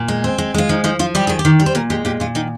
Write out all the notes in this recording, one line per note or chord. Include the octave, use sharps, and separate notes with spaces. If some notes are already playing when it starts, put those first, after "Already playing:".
Already playing: A#2
G#3
C4
G#3
G#3 F4
F3 D#4
F3 D#4
F3 F4
G3 G4
D#3 G#4
G4
D#3
G3
C5
A#2 A#4
G#3 G4
A#2 G4
A#2 F4
D#3 D#4